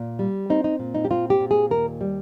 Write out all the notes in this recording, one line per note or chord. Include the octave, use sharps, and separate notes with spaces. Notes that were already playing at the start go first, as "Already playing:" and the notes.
Already playing: A#2
G3
C4 D#4
D#4
A#2
D#4
G4
C4 F4
G4
A#2
G#4
D#2 A#4
G3